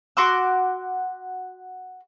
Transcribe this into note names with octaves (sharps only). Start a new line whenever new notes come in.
F#4 C6 D6 E6